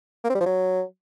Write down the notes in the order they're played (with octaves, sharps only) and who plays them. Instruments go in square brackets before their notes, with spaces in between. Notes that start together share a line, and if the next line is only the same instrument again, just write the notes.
[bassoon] A#3
C4
G3
F3
F#3